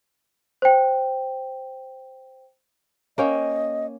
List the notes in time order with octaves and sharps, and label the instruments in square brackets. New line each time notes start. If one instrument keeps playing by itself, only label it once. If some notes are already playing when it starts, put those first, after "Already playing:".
[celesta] C5 G5
[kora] A#3 C#4 G5 [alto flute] D#5